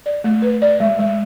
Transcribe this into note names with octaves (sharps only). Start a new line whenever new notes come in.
D5
A3
B4
D5
G#3
G#3